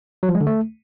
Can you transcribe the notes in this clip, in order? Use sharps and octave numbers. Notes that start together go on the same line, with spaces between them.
F#3
F3
G#3
D3
A3